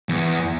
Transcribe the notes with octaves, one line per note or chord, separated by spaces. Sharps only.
E2